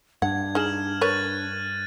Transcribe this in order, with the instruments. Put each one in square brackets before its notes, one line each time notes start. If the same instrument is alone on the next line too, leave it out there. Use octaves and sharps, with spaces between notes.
[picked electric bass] G2 [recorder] D4 [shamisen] F#5 [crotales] G#6
[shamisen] D#4 G#4 [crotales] F6 E7 F#7
[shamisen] A#4 B4 C#5 [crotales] F#6 A6 D#7